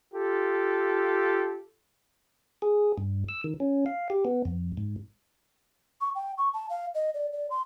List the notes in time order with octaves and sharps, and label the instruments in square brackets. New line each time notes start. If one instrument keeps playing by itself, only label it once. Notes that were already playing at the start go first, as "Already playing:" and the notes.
[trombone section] F4 G4 A4
[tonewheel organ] G#4
G2
E6
D#3
C#4
F5
G4
B3
F2
G#2
[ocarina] C#6
G5
C#6
A5
F5
D#5
D5
D5
C6